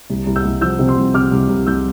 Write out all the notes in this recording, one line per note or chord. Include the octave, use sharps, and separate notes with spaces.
C2
C2
E6 G6
C2
F3 E6 G6
C3
C6 E6
C2
C3 D6 F6
C2
C2
C2 E6 G6